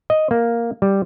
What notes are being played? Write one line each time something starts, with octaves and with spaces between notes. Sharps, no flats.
D#5
A#3
G3